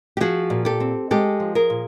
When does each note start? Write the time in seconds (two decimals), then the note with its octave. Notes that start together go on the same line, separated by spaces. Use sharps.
0.17 G4
0.21 F3 F#4 G#4
0.50 A#2
0.65 G4 A4
0.80 C4
1.11 G#3 G4 A4
1.40 F3
1.55 G#4 A#4
1.70 A#2